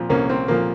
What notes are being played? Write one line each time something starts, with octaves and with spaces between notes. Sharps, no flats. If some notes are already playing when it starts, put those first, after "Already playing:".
Already playing: A#2 F3 C4
C2 A#3 C#4
C4
A#2 F3 A#3